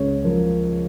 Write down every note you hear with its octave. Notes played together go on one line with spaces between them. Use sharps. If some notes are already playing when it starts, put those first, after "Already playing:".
Already playing: C#2 C#3 C#5
F3 A#4